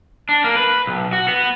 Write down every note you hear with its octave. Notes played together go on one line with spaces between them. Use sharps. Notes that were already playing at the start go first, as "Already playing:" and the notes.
D4
A#3
B4
B1
F#4
B3